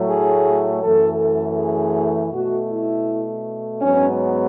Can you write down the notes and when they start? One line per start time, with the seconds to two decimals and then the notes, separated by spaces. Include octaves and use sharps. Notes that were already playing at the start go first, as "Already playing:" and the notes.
Already playing: A2 F#3 A3
0.08 G#4
0.82 F#2 E3 A3 A4
1.20 A4
1.58 G#4
2.32 B2 A3 F#4
2.70 E4
3.81 G#2 F#3 B3 C#4